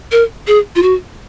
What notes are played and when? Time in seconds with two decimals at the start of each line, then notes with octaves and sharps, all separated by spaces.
0.12 A#4
0.48 G#4
0.76 F4
0.83 F#4